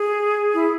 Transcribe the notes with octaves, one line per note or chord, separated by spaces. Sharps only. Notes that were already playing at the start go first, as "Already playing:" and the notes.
Already playing: G#4
E4